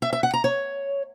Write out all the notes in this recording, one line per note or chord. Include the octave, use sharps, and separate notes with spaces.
E5
E5
F#5
A#5
C#5